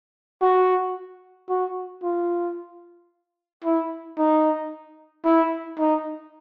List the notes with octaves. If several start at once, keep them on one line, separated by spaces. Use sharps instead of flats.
F#4
F#4
F4
E4
D#4
E4
D#4